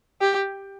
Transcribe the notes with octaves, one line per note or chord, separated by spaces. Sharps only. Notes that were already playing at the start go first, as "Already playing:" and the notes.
G4